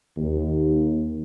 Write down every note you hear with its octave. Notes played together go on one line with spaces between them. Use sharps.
D#2